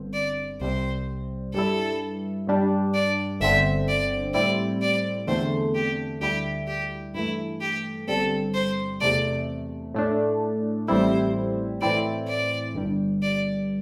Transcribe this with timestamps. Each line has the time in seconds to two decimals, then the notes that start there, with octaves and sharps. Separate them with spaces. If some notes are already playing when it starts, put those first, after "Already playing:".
Already playing: G1 G2 D3 C4
0.14 D5
0.60 C2 C3 G3 C4 C5
1.53 G2 G3 E4 A4
2.47 G2 G3 D4
2.94 D5
3.40 G1 G2 D3 C4 E5
3.88 D5
4.34 A2 G3 C4 E4 D5
4.81 D5
5.27 E2 D3 A3 C4 C5
5.75 G4
6.21 D2 D3 G3 E4 G4
6.67 G4
7.14 G2 E3 A3 E4
7.61 G4
8.07 G1 G2 G3 C4 A4
8.54 C5
9.01 E2 C3 A3 D5
9.95 A2 A3 D4
10.88 A1 A2 G3 C4 E4 C5
11.81 A2 E3 C4 E4 D5
12.28 D5
12.75 G1 G2 G3
13.22 D5